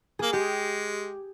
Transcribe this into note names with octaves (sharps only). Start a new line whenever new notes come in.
A#3 G#4
G#3 G4